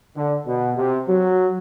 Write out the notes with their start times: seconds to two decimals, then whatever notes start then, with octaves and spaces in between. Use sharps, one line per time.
0.17 D3
0.46 B2
0.77 C3
1.07 F#3